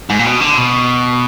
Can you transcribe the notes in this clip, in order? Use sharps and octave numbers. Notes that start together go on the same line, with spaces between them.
G#2
A#2
B2
D3
B2